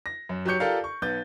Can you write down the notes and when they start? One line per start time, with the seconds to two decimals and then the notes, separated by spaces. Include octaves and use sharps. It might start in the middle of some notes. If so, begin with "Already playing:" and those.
0.06 A#6
0.29 F#2
0.46 F#3 G4 C#5 G6 C#7
0.60 F4 G4 A4 A#4 D5 F5
0.84 C#6
1.02 B1 B3 G6 A6